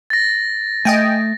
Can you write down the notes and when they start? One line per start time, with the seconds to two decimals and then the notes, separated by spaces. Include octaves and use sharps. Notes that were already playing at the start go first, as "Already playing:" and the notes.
0.10 A6 A#6
0.85 A3 D#5 G5 G#5